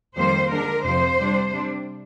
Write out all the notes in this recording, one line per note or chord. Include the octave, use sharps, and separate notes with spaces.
F2 D#3 G3 A#3 C5
D3 G#3 D4 A#4
F2 C3 F3 C5
C3 G3 D4
C3 G3 D4